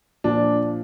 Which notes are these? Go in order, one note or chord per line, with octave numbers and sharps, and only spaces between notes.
A#2 F3 D4